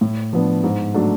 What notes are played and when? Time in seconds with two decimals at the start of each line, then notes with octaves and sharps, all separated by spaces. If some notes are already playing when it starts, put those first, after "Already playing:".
0.01 A2
0.33 F3 B3 D4
0.63 G#2
0.94 F#3 A3 D4